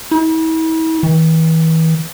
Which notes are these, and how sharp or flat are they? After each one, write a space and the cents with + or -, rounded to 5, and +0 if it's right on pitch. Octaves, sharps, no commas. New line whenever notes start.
E4 -40
E3 -35